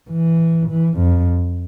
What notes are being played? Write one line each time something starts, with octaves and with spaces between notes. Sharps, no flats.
E3
E3
F2